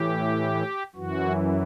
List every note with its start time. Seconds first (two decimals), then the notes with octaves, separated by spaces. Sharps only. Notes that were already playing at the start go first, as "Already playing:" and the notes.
Already playing: A2 E3 G4
0.96 F#2 E3 F#4